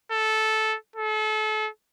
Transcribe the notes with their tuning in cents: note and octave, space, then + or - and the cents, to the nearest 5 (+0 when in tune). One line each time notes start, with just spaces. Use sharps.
A4 -10
A4 -35